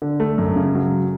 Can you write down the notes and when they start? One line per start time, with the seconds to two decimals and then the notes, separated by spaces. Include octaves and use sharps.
0.02 D3
0.20 A3
0.38 F#2
0.56 C#3
0.75 F#3